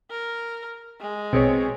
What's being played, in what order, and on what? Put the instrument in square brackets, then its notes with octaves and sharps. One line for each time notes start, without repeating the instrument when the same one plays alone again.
[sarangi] A#4
G#3
[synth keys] A#1 B2 [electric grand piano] C4 G#4 C#5